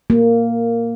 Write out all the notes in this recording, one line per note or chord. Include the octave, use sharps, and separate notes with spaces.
A#3